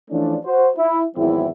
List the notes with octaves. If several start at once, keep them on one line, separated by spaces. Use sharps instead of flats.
E3 F3 A3 C#4 D4
F#4 C5
E4
G#1 E2 F#3 C4 E4